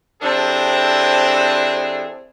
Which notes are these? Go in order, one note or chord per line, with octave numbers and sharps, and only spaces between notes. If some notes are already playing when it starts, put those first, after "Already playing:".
C3 E3 C4 D4 G#4 A4